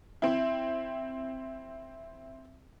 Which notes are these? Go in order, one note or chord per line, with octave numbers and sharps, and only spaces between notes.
C4 E4